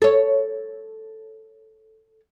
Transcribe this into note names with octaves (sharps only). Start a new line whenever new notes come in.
A4 C#5